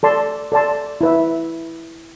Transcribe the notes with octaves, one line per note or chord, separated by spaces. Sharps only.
A4 D5 A5 C6
A4 D5 A5 C6
E4 B4 E5